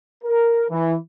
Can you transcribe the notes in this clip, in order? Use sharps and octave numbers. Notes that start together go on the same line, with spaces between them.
A#4
E3